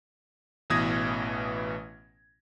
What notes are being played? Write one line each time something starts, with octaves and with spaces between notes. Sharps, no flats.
A1 B2 E3 D#6 G#6 A#6